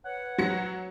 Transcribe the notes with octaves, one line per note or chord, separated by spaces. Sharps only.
B4 C#5 F#5
F#3 A#6 C#7